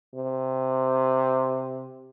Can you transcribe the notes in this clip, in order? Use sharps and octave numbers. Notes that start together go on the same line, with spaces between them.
C3